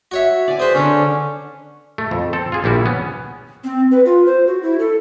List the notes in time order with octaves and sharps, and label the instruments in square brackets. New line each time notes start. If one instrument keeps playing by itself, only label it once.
[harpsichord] F#4 C#5 E5
[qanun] D5 G#5
[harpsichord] G#4 B4 [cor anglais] C5
[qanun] D3 D4 [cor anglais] C#4
[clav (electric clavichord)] A3
F2
C4 A4
F4 G#4
A#1 G3 E4 F#4
B3 C#4
[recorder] C4
B4
F4
C5
F#4
E4
A4